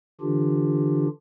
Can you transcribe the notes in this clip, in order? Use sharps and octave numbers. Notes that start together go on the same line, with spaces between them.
D3 E3 D4 F4 G4